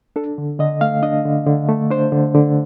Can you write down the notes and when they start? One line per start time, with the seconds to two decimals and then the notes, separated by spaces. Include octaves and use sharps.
0.16 D4 A4
0.38 D3
0.59 D3 D#5
0.81 A3 F5
1.03 D4 D#5
1.25 D3
1.47 D3
1.69 A3
1.90 D4 C5
2.12 D3
2.34 D3